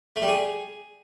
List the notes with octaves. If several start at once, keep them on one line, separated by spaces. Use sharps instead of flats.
A3
G3
G#4